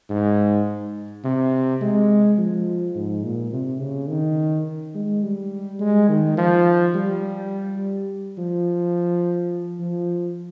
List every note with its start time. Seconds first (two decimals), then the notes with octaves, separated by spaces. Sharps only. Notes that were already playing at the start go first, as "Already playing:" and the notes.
0.10 G#2
1.24 C3
1.81 G#3
2.38 F3
2.95 G#2
3.23 A#2
3.52 C3
3.80 C#3
4.09 D#3
4.94 G#3
5.23 G3
5.80 G#3
6.09 D#3
6.37 F3
6.95 G3
8.37 F3
9.80 F3